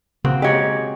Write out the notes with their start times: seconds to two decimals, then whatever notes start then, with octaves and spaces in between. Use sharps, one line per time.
0.24 C#3 A#3 C4 F#4
0.42 G#3 G4 C#5 D#5